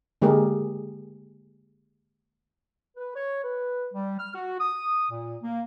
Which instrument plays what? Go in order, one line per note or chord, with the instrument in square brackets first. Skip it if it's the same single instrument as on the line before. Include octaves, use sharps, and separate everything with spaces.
[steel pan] D3 G#3 A#3 G4 G#4 A#4
[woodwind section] B4
C#5
B4
G3
F6
F#4
D#6
A#2
A#3